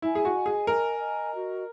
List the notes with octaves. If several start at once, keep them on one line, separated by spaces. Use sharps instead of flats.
E4 G#5
G#4
F#4
D#5
G#4
A#4 G#5
D#5
F#4